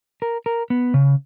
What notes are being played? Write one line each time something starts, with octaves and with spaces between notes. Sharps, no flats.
A#4
A#4
B3
C#3